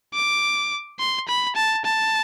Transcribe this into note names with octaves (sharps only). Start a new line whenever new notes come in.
D6
C6
B5
A5
A5